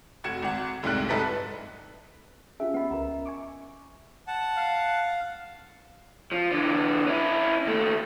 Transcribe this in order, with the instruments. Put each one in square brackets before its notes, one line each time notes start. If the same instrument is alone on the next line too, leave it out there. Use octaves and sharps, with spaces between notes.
[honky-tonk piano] F1 F#4 G#6 C#7 E7
G#1 F#5
F1 C2 G#2 G3 F#6
C2 G#2 A4 B4 D#5 B6
[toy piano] C#4 [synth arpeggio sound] F4 G4 G#4 [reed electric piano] E5
[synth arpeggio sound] B3 B5 [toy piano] D#5 F#5
[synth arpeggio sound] C#2 A#4 [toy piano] A#5
[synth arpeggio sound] G#5 C#6 D6
[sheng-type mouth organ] F#5 A5
[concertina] F5
[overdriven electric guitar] F3
D3 E3
C#4 E4
D#2 A3